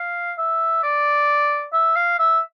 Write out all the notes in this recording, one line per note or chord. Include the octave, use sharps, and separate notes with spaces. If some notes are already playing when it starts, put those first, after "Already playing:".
Already playing: F5
E5
D5
E5
F5
E5